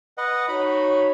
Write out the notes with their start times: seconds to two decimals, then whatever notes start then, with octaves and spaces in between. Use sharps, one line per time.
0.18 B4 D#5 F#5
0.49 D#4 F#4 C#5 B5